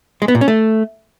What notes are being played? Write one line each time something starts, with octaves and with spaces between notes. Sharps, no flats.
G#3
B3
A#2
C#4
A3